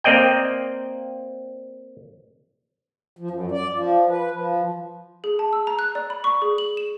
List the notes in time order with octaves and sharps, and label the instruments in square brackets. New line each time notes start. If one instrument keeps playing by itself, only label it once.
[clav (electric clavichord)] A#3 C4 D5 D#5 G5
[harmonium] F3
F#2
D5
F3
B4
F3
[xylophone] G#4
A5
E6
A#5
F#6
D5
B5
C#6
G#4
F#7
E7